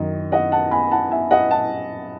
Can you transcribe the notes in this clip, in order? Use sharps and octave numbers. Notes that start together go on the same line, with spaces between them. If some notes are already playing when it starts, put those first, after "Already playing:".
Already playing: F#2 D#3 D#5
D#5 F#5
F#5 A5
G#5 B5
F#5 A5
E5 G#5
D#5 F#5
F#5 A5